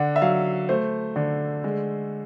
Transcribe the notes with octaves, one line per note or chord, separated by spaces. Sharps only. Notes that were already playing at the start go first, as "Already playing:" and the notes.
Already playing: D3 F#5
E5
F#3 F5
A3 C5
D3
G#3